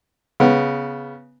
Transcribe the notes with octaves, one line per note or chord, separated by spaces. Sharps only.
C#3 B3